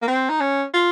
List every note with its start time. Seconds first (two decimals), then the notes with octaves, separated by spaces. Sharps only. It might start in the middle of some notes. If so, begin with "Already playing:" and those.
0.02 A#3
0.08 C4
0.30 D#4
0.41 C#4
0.74 F4